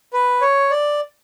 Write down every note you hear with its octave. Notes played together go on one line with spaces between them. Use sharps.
B4
C#5
D5